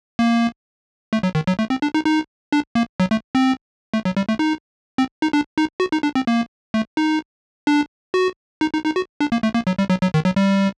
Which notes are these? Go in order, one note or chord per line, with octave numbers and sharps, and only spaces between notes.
A#3
A3
F#3
D#3
F#3
A3
C4
D4
D#4
D#4
D4
A#3
F#3
A3
C4
A3
F#3
G3
A3
D#4
C4
D#4
D4
D#4
F#4
D#4
D4
C4
A#3
A3
D#4
D4
F#4
D#4
D#4
D#4
F#4
D4
A#3
A3
A#3
F#3
G3
F#3
F#3
D#3
F#3
G3